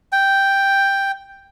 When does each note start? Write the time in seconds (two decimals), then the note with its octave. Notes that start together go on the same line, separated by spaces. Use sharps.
0.12 G5